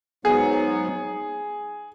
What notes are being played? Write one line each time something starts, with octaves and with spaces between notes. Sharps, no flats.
G#2 F#3 B3 G#4